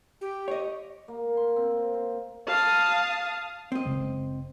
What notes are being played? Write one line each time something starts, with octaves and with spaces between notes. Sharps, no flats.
G4
C#5 D#5
A#3
C6
C4
C4
F5 A5 D#6
C4 D#5
F#1 C#3 G#3